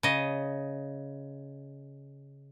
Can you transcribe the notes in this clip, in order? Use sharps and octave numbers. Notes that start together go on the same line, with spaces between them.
C#3 D#5